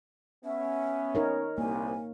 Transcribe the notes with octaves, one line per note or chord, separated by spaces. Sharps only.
B3 C#4 E5
D#4 A#4 C#5
C2 A#3 G#5